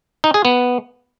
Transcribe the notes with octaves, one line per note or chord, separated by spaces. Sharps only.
D#4
G#4
B3